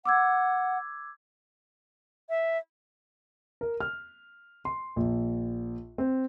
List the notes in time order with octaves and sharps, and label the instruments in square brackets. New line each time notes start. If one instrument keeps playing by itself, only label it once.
[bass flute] F#5 [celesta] D6 E6 G#6
[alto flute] E5
[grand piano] A#4
F6
C6
A#1
C4